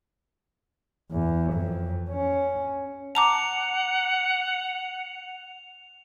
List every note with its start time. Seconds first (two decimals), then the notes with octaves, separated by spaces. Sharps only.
1.11 E2
1.53 F2
2.10 C#4
3.15 F#5 A5 A#5 D6 F7